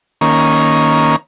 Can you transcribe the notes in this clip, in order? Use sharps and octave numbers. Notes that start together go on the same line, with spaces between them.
D#3 A#3 C#4